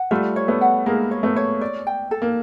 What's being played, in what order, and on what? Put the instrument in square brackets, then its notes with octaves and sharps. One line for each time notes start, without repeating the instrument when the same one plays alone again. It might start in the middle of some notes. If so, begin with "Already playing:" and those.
Already playing: [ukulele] F#5
[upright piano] G3 A3 [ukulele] F4
[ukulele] C#5
[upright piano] A3 B3
[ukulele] F#5
[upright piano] G#3 A#3 [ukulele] A#4
[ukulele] C#5
[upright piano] A3 B3
[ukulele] C#5
D5
G5
A4
[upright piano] A#3